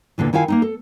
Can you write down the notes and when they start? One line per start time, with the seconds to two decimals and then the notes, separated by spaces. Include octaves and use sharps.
0.18 E2 A#2 D3 E3
0.33 D#3 E4 F4 F5 G#5
0.48 A#3 C4 D#4
0.62 A4